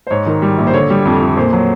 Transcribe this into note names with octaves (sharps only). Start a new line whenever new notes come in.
C5
G#2 C#5
D#3
G3
A#1
C5
D3 C#5
G3
F2
F2
A#2 C5
F#3